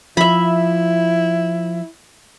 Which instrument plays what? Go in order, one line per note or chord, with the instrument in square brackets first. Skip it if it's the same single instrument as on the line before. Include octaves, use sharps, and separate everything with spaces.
[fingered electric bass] F3 [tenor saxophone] E4 [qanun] E5 B5